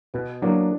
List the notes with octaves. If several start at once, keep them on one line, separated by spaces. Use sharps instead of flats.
B2 B3
F#3 A#3 D4